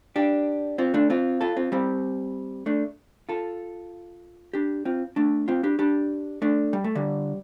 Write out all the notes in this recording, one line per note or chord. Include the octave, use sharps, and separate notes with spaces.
D4 G4
C4 F4
A3 D4
C4 F4
F4 A4
C4 F4
G3 C4
A3 D4
F4 A4
D4 G4
C4 F4
A3 D4
C4 F4
D4 G4
D4 G4
A3 D4
G3
A3
D3 G3